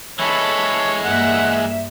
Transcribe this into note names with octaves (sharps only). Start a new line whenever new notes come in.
E3 G#3 A4 C#5 B5
G2 A#3 E5 F#5